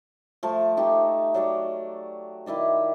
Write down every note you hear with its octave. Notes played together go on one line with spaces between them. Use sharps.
F3 A3 A5
A3 D#4 G4
F#3 D5 F5 G5
D#3 E4 D5 D#5